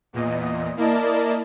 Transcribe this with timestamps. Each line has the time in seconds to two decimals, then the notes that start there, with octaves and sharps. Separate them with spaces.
0.13 E2 A#2 D#5
0.76 A#3 E4 A#4 D5 D#5 A5